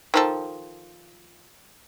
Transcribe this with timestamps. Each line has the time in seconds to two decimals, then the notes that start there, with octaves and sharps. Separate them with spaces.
0.14 D#3 F3 A4